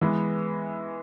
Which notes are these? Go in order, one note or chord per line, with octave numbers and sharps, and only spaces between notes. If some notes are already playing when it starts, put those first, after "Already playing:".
E3 G#3 B3